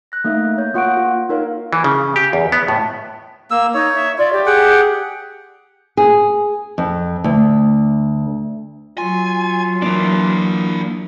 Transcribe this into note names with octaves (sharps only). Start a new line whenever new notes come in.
F#6 A#6
A3 A#3 D#4 E5
C#5 G6
A#3 F4 F#5 C#6 F#6 D7
F4
D#4 F4 A#4 C#5 F5
E3
C#3
G4
E2
B3
A2
A#3 E6
D#4 C#5
E5
F4 D5
G4
G#4 F#5 G5
G#4
F2
D2
F#3 F4 G#5
E3 A#3 D4 E4 D5